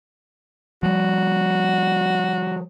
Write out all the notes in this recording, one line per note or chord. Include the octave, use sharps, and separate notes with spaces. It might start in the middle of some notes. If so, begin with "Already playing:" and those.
F3 G3 F#4